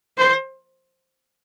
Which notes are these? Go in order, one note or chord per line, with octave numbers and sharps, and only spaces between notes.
C5